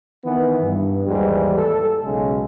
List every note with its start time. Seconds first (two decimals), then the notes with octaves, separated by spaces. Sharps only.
0.24 D#3 E3 B3
0.62 G2
1.07 D#2 G#2 E3 G3
1.57 A4
2.05 B1 C#3 G#3